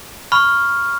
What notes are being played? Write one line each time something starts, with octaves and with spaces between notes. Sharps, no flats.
B5 C#6 F6